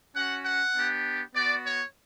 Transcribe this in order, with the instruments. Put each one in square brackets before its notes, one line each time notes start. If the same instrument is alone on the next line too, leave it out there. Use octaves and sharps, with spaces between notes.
[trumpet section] C#4 F#4 F#5
F#5
B3 D4 G4
B3 F#4 D5
C#5